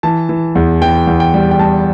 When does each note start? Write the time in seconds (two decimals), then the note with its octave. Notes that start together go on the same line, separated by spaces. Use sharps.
0.03 E3 A5
0.29 E3
0.55 E2
0.81 E3 G5
1.07 E2
1.20 G5
1.34 G3
1.51 G5
1.59 G3 A5